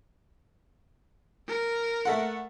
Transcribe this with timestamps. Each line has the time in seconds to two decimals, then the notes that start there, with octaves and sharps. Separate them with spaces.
1.48 A#4
2.05 A3 A4 F#5